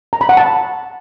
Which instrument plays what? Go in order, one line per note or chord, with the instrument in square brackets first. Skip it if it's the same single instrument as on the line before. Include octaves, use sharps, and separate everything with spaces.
[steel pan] A#5
B5
F#5
A5